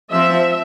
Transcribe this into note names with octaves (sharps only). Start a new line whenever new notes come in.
F3 C4 E5